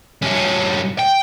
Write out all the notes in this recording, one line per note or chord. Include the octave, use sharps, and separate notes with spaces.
G2 C#4
G5